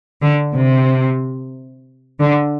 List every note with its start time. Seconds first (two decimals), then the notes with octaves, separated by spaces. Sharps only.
0.22 D3
0.55 C3
2.21 D3